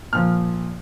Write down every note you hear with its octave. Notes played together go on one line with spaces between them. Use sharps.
A#2 F3 F6